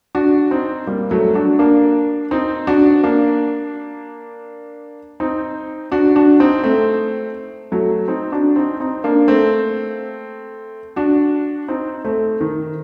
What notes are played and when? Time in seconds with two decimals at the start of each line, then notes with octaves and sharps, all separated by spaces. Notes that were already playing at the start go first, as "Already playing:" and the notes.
0.15 D4 F#4
0.51 C4 D#4
0.87 G3 A#3
1.11 F#3 A3
1.35 D4 F#4
1.59 A#3 D4
2.31 C4 D#4
2.67 D4 F#4
3.03 A#3 D4
5.20 C4 D#4
5.92 D4 F#4
6.16 D4 F#4
6.40 C4 D#4
6.64 A3 C4
7.72 F#3 A3
8.08 C4 D#4
8.32 D4 F#4
8.56 C4 D#4
8.80 C4 D#4
9.04 A#3 D4
9.28 A3 C4
10.96 D4 F#4
11.68 C4 D#4
12.05 A3 C4
12.41 D#3